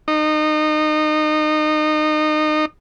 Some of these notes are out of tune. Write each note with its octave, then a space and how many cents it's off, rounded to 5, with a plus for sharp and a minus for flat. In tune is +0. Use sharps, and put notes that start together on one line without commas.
D#4 -25